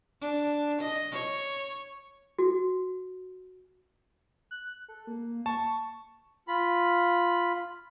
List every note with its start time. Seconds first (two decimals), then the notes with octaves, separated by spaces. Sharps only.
0.21 D4
0.81 D#5
1.11 C#5
2.39 F#4
4.51 F#6
4.88 A4
5.07 A#3
5.46 A5 C#6
6.48 F4 B5